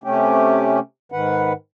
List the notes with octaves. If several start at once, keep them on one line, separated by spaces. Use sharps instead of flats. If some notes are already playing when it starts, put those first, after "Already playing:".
C3 A3 C#4 G4
G#2 D#3 B4 F#5